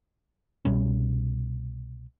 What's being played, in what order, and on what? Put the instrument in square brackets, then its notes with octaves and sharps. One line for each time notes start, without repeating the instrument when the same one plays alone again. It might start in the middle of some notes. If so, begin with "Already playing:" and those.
[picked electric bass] C2 B2 G3 C#4